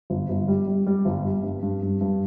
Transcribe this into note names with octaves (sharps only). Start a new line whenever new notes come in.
G1
G1
G3
G3
G3
G1
G3
G2
G2
G2
G2